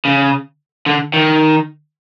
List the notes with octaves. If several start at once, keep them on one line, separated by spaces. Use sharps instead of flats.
C#3
D3
D#3